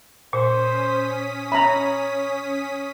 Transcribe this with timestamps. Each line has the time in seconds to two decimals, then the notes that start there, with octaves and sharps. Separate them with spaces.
0.33 A#2 C#4 C5 D#6 B6
1.52 C#5 E5 A#5 B5